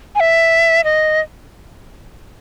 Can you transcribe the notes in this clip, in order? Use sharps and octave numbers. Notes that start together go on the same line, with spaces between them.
G#5
E5
D#5